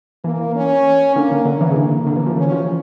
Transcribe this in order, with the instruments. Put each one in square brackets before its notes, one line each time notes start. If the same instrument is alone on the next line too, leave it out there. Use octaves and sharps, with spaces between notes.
[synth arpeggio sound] E3 [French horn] A#3
[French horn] C#4
[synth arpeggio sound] D3 [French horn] A#3
[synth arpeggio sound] D3
[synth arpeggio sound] D3 [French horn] A#3
[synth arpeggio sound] E3
C#3
D3
C#3
D3
E3
F3
[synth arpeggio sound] E3 [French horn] C#4
[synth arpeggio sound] F3